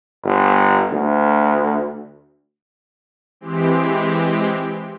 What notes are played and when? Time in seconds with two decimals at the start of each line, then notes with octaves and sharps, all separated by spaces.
0.24 G1
0.92 D2
3.41 E3 G#3 C4 G4